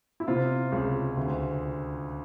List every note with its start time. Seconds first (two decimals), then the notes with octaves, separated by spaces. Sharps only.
0.20 E4
0.28 C3 F4
0.72 C#2
1.17 D2